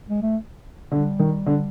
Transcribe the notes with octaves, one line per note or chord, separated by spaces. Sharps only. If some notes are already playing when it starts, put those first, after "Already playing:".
G#3
A3
D3 G3
D#3
D3